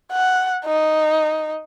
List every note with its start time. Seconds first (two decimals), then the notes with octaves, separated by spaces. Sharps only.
0.12 F#5
0.65 D#4